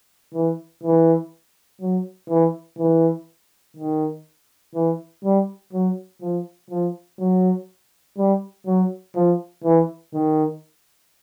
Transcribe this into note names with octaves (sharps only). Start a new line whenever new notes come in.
E3
E3
F#3
E3
E3
D#3
E3
G3
F#3
F3
F3
F#3
G3
F#3
F3
E3
D#3